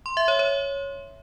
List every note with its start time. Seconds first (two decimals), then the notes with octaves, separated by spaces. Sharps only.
0.06 C6
0.17 E5
0.28 C#5
0.39 C#5